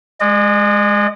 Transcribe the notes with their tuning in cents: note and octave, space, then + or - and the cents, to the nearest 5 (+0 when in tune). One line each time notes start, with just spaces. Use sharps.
G#3 +0 D#5 -45